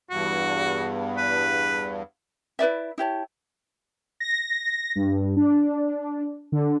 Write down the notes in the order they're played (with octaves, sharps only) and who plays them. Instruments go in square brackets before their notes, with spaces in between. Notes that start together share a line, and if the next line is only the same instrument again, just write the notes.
[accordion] E2 G2 [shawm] F#4
[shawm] B4
[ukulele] E4 B4 D5 E5
E4 G4 C#5 A5
[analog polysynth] A#6
G2
D4
D3